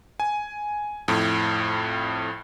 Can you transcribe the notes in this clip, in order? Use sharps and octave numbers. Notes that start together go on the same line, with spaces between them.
G#5
F2 A2